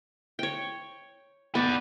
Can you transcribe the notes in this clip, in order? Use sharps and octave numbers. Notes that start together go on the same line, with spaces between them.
C#5 G5
B3 B4 D5